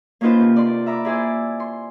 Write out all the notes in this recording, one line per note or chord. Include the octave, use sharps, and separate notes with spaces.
A#3 C#4 D#4 F4 B4 C5
C3
D5 C6
E5 A#5 B5 D6
E4 G#4 C5 D5
C6